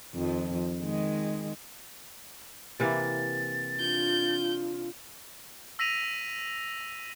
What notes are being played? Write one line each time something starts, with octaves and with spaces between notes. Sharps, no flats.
F2 D#3 F3
D#3 G#3
C3 E3 A#3 A6
D4 F4 G6
E6 A#6 B6 D#7 F7